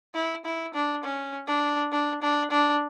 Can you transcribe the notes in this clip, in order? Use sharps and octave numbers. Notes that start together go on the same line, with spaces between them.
E4
E4
D4
C#4
D4
D4
D4
D4